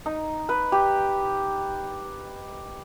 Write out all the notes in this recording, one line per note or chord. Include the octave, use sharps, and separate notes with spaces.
D#4
B4
G4